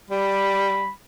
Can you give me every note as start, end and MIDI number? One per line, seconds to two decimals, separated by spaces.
0.11 0.91 55
0.11 0.92 83